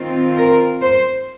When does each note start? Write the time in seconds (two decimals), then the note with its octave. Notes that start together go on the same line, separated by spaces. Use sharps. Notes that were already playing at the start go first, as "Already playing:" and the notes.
Already playing: D#3 C4 F4
0.37 A#4
0.82 C5